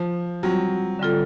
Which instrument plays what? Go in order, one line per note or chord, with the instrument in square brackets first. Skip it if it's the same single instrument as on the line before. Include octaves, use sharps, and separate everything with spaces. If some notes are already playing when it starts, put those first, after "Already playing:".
Already playing: [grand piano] F3
[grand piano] F#3 [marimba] G3 C4 F4
[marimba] D3 G3 C4 F4 A4